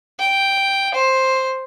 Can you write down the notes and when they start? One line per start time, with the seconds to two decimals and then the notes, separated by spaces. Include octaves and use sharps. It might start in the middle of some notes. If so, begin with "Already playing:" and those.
0.19 G5
0.94 C5